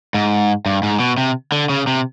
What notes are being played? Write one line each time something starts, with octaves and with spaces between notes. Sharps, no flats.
G#2
G2
G#2
B2
C3
D3
C#3
C3